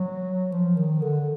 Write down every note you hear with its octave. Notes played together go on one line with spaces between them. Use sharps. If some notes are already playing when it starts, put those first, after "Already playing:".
Already playing: F#3
F3
D#3
D3